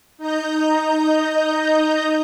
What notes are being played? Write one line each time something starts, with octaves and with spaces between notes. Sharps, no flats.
D#4 D#5 A#5 G6